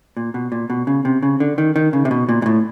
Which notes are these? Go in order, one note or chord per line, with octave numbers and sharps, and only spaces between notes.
A#2
B2
A#2
B2
C#3
C3
C#3
D3
D#3
D#3
C#3
C3
B2
A#2
A#2
A2